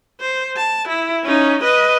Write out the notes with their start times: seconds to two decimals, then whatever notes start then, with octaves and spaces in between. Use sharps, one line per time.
0.20 C5
0.57 A5
0.88 E4
1.24 C#4 D#4
1.63 B4 D#5